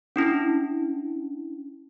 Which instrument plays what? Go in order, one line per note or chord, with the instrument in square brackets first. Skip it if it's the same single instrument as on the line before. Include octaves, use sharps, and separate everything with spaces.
[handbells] C#4 D4 E4